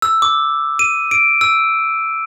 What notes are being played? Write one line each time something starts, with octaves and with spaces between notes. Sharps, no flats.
E6
D6
D#7
D7
E6